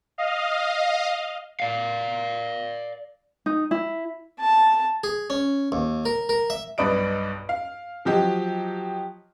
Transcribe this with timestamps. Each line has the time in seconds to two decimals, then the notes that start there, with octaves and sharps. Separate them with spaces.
0.18 D#5 F5
1.60 D5 F5
3.46 D#4
3.71 E4
4.40 A5
5.04 G#4
5.30 C#4
5.72 D#2
6.05 A#4
6.29 A#4
6.50 E5
6.78 B1 G2 B4 D5 D#6 D7
7.49 F5
8.05 F3 F#3 G4 D#5